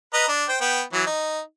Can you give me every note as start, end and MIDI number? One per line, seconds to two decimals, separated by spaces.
0.13 0.26 71
0.13 0.26 75
0.13 0.26 82
0.28 0.45 62
0.49 0.58 72
0.49 0.58 79
0.61 0.82 59
0.61 0.82 79
0.93 1.04 52
0.93 1.04 54
1.06 1.40 63